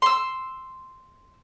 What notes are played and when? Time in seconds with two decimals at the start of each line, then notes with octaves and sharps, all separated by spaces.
0.02 C6 E6